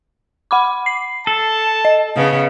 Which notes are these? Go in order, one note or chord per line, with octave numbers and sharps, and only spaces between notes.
F#5 B5 D6
C7
A4 A5
D#5
C#3 B3